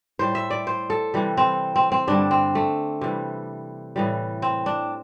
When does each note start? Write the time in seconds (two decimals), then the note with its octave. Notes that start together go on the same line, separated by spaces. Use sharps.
0.19 A2 G3 C5
0.35 E5
0.50 D5
0.67 C5
0.90 A4
1.14 C3 E3 G3
1.37 C4
1.76 C4
1.92 C4
2.07 G2 D3 G3 D4
2.31 C4
2.55 A3
3.01 C3 E3 G3
3.96 A2 E3 G3
4.42 C4
4.66 D4